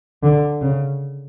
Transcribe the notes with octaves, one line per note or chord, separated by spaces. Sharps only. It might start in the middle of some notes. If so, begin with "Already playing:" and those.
D3
C#3